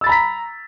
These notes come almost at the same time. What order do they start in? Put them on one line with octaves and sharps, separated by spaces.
E6 A6 B5 A#5 B6